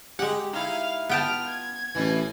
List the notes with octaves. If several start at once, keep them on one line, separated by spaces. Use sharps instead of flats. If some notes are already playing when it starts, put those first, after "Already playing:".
G#3 G4 F#5
D#4 E4 F5
B3 F4 G5 A5 F6
G#6
A1 B2 E3